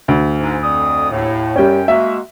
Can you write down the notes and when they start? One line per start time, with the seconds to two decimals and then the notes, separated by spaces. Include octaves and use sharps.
0.08 D2
0.39 G#2
0.63 F2 D5 D#6
1.09 D#2 A2
1.56 F#2 G3 C#4 G5
1.88 G#3 A#3 F#4 E5